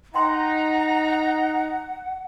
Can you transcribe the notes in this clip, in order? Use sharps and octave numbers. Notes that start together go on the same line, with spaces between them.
D#4 F#5 G5 A#5 C6